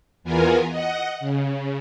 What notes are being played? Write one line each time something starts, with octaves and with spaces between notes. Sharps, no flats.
E2 E3 B3 F4 A#4 G#5
D#5 F#5
C#3